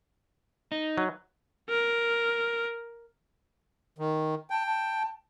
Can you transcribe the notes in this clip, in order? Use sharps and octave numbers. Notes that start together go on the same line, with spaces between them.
D#4
F#3
A#4
D#3
G5 A5
A5